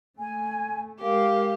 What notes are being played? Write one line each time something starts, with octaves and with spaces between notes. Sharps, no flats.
A3 G#5
G#3 G4 A#4 F5